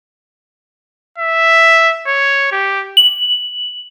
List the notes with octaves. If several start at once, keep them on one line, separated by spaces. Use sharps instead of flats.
E5
C#5
G4
F#7